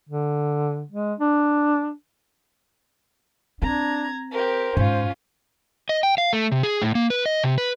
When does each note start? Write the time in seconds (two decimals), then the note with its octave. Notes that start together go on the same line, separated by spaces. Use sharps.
0.09 D3
0.91 G#3
1.19 D4
3.62 C4 D4 A#5 G#6
4.31 G4 A#4 C5
4.77 G#2 C#4 F4
5.89 D#5
6.03 G5
6.18 F5
6.33 A3
6.52 C3
6.63 G#4
6.82 A2
6.95 A#3
7.10 B4
7.26 D#5
7.44 C3
7.58 B4